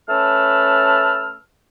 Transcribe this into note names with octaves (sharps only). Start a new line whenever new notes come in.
A3 C#4 B4 A5 E6 F6